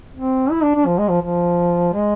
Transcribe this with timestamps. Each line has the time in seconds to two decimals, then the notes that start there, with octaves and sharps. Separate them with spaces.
0.15 C4
0.51 E4
0.63 D4
0.75 D4
0.86 F3
0.98 G#3
1.09 F3
1.22 F3
1.93 G#3